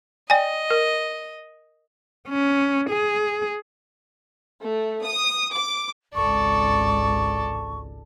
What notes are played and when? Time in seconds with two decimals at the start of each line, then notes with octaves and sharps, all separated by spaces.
0.30 D5 D#5 G5 G#5
0.70 A#4
2.28 C#4
2.90 G#4
4.62 A3
5.03 D#6
5.53 D6
6.15 G#1 C#2 A4 D5 C#6